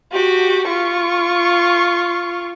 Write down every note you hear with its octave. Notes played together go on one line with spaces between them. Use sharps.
F#4 G4
F4 C#6